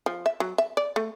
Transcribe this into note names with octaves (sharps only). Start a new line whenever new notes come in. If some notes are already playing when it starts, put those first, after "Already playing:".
F3
E5
F#3
E5
D5
A3